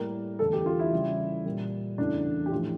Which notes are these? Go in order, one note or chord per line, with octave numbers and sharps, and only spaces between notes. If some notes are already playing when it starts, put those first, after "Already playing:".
Already playing: A2 G3 A#3 A#4
E2 D3 A3 A4
G4
F4
E4
C#3 E3 G3
A#2 G3 A#3
E2 C#3 E3 A3 D4
G4
A2 F3 A3 F4